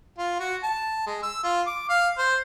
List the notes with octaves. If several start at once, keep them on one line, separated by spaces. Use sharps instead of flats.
F4
F#4
A5
G#3
E6
F4
D6
F5
C5